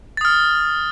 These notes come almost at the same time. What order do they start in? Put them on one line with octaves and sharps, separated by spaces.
A6 D#6 F6